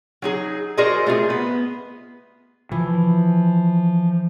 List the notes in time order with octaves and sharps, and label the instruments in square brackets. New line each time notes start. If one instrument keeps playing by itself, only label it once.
[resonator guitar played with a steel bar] F#3 D#4 G#4
F#4 G#4 A#4 C5 D5 D#5
A3 F4 G#4
B3
[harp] E3 [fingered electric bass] F3